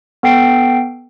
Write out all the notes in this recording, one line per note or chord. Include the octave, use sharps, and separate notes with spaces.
B3 A4 G5 C7 D7